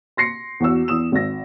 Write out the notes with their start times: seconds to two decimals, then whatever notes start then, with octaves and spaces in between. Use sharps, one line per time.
0.17 C6 A#6 C7 C#7
0.60 E2 F#4 E6
0.88 E2 D#6 E7
1.12 G#1 A#6